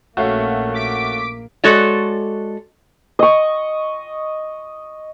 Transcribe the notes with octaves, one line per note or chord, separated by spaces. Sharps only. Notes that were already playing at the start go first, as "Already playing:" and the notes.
A#1 A3 A#3 C#4 F#4 E5 F5
D6 B6 D7
G#3 F#4 A4 C#5 D5
D#5 C#6